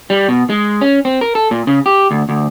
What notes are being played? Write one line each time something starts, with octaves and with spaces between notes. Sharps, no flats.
G3
B2
G#3
C#4
C4
A#4
A4
A#2
C#3
G4
D2
D2